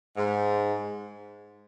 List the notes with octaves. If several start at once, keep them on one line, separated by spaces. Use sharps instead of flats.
G#2